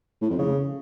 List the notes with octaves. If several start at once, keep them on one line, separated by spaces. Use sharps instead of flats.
A2
F2
C#3